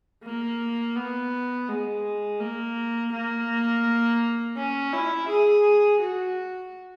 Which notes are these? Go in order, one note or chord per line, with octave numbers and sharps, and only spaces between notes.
A#3
B3
G#3
A#3
A#3
C#4
E4
G#4
F#4